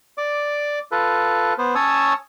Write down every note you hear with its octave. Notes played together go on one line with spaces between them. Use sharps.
D5 D6
F4 A4 B4
B3 C5
C#4 C#5 A5 D#6 E6